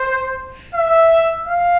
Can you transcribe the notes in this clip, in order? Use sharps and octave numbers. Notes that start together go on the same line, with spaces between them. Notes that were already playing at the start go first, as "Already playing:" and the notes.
Already playing: C5
E5
F5